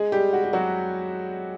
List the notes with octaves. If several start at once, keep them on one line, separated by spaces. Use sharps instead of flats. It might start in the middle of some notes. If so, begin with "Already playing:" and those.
Already playing: G#3 G#4
G3 G4
F#4
G4
F#3 F#4